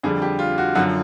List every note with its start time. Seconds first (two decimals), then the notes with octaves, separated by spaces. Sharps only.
0.03 F2 D3 G3 G#4
0.22 G4
0.39 F4
0.58 F#4
0.75 F#2 D3 F3 F#4